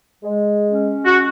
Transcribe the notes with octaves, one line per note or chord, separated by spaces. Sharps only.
G#3
C#4
F#4